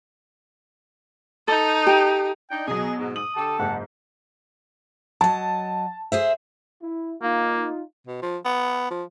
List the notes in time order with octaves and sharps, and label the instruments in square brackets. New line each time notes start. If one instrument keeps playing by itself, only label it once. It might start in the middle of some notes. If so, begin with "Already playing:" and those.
[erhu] D#4 [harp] A4
[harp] G4
[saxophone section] D4 D#4 [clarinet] G5
[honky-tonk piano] B2 F#3 [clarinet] B3 [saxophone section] G#4
[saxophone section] G#2
[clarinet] D#6 [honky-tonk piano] F#7
[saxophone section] D3 G4 A4 [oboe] A5
[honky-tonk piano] F#1 G#2 [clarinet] F#5
[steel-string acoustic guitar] F#3 D#5 [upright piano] A5
[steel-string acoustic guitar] G#4 C5 E5
[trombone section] E4
[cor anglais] A#3 [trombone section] D#4 F4
[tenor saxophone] B2
F3
B3
F3